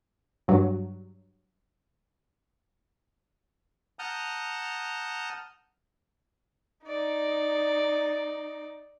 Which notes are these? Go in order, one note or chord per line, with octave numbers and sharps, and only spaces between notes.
G2 F#3
F#5 A5 A#5 D#6 F6 G6
D#4 D5